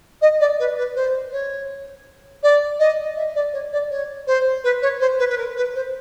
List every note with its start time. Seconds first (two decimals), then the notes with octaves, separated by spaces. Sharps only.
0.21 D#5
0.40 D5
0.59 B4
0.78 B4
0.96 C5
1.32 C#5
2.43 D5
2.79 D#5
3.16 E5
3.35 D5
3.53 C#5
3.72 D5
3.90 C#5
4.27 C5
4.64 B4
4.82 C#5
5.00 C5
5.19 B4
5.30 B4
5.38 A#4
5.56 B4
5.75 C5